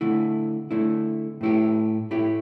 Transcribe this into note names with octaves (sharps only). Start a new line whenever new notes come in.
D3 A3 E4
D3 A3 E4
A2 A3 E4 G4
A2 A3 E4 G4